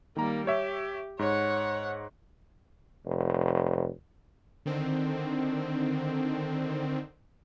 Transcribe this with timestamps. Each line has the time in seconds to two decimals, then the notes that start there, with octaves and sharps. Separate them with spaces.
0.16 D#3 G3 A#3 A#5
0.47 G4 C#5 E5
1.19 G#2 C#5 F#5
3.06 F1
4.66 D3 D#3 C4